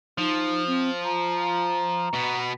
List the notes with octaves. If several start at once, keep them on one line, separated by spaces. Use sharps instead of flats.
F3 D#4
C4
A#5
B2 B3